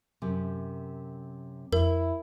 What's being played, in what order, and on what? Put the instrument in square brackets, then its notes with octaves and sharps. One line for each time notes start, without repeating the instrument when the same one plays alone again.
[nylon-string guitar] F#2 C3
[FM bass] F2 [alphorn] E4 [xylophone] A#4